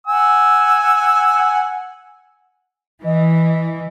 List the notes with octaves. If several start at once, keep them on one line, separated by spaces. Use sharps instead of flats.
F#5 G#5 E6
E3 D#5